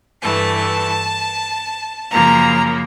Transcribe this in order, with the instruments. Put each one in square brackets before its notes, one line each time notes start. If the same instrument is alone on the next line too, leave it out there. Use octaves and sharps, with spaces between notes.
[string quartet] G2 E3 A3 A5
F#2 C#3 F3 A#3 A#5